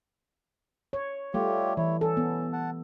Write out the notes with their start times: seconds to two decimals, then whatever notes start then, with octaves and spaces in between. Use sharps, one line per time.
0.93 C#5
1.34 G3 A3 F4 G4 C#5
1.77 E3 E4 C#5
2.01 C#4 A4
2.17 B3
2.53 F#5 A5